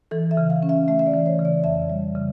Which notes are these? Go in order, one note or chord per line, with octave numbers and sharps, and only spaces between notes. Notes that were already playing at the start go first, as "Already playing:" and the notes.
E3 A4
E5
C#3
F5
C#4
E5
A3 E5
E5
D5
E3
C#5
C#3
D5
F2 E5
G3
C#3